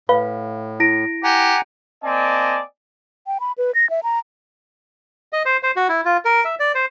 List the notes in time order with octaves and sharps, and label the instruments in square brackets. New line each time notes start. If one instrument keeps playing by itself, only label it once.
[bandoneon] A2 [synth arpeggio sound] B4 [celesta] F5
[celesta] E4 A#6 D7
[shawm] G4 [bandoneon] F#5 G#5 A#5
[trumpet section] A#3 C4 D5 D#5 G#5 A5
[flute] G5
B5
B4
A#6
E5
A#5
[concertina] D#5
C5
C5
F#4
E4
F4
A#4
E5
D5
C5